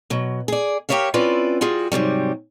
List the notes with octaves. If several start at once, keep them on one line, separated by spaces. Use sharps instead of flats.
B2 F#3
G#4 D5
G4 G#4 A#4 C#5 E5 F5
C4 C#4 E4 F4 B4 D5
G3 F4 F#4 G#4
G#2 C3 F#3 G3